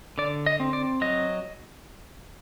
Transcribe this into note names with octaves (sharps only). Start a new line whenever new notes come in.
D3 D5
D#5
C4
D5
F#3 D#5